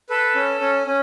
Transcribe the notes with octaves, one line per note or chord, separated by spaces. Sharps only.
A4 B4
C#4
C#4
C#4